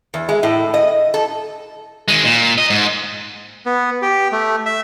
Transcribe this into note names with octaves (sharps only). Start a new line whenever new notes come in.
E2
G#3
A2
D#5
A4
D#3 G#3
A#2
D#5
G#2
B3
G4
A3
E5